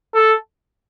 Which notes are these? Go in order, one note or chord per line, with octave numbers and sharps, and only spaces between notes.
A4